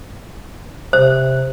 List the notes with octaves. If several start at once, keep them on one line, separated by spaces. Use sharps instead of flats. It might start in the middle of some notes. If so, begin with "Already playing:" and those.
C3 C5